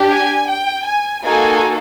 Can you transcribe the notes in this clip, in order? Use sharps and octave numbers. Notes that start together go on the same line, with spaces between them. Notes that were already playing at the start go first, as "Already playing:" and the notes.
Already playing: D4 G4
G#5
G5
G#5
A#3 D#4 F#4 A4 G#5